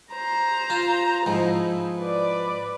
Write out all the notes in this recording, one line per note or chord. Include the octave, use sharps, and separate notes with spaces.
C5 A#5
F4
G#2 F3 D#4 E4
B4 D5